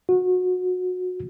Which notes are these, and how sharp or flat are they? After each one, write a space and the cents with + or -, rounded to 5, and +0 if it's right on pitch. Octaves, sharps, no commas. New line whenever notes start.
F#4 -25